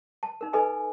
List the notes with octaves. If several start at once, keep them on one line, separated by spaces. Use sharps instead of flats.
A5
D#4 A#4
D#4 A4 B4 D#5 G#5